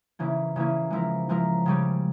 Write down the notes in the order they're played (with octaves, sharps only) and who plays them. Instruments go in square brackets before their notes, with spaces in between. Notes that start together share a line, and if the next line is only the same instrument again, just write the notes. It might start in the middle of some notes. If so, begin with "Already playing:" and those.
[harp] C#3 E3 A#3 C#4 E4
C#3 E3 A#3 C#4 E4
F3 G#3 E4 A#4
F3 G#3 E4 A#4
C#3 G3 C#4 G4